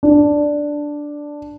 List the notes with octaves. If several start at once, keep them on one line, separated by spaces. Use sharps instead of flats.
D4